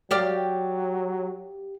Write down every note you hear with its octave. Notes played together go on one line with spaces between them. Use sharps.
F#3 G4 D5 F5